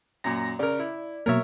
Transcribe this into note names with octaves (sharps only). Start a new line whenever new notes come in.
F#2 A#2 A#6
C#3 A#4 D5
E4
B2 F#3 A#3 A#4 C#5 E5